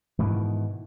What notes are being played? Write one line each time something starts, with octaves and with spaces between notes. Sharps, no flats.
G#2 B2 D#3 E3